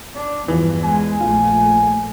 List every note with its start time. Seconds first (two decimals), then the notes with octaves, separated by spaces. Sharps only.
0.15 D4
0.48 E2 G2 E3 F3
0.85 G#3 G#5
1.20 A#1 A3 F4